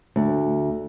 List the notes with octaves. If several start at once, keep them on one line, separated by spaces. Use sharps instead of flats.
D2